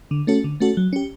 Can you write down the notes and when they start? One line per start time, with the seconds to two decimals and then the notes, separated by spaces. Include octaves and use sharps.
0.11 D3
0.27 A3 C#4 F#4 A4
0.44 D3
0.60 A3 C#4 F#4 A4
0.77 F#3
0.93 C#4 G4